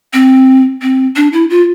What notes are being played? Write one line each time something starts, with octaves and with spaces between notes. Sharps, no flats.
C4
C4
D4
E4
F4